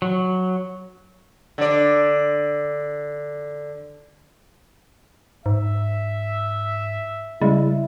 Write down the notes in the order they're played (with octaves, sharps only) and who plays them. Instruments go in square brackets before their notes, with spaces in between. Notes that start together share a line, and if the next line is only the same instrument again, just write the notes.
[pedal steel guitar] F#3
[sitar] D3 D5
[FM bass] G#2 [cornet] E5
[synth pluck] C#3 G#3 [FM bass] G3 [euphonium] E4